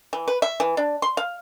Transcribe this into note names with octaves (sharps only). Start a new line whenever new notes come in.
E3
B4
E5
E3
D4
C6
F5